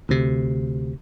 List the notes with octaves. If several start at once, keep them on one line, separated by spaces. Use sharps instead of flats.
D2 C3